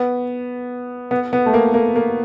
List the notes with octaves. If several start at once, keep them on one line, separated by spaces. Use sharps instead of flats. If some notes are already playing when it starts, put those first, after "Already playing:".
Already playing: B3
B3
B3
A3
A#3
A#3
A#3